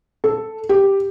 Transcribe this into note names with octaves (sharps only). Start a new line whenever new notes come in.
A4
G4